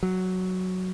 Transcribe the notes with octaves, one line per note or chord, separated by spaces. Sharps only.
F#3